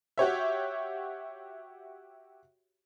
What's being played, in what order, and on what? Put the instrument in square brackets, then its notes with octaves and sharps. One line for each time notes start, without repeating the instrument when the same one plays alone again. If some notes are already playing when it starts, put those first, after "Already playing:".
[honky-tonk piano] F#4 G4 C#5 E5